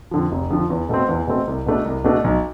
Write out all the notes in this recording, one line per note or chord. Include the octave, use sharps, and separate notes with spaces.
F2 D3 F3
F1
F2 D3 F3
E2
B2 A3 C4
E2
B2 A3 C4
C2
B2 A3 D4
C2
B2 A3 D4
B1